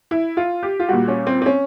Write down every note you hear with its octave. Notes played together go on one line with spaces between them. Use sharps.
E4
F4
G4
F4
A#2 G3 F#4
C#4
C4
C4
C#4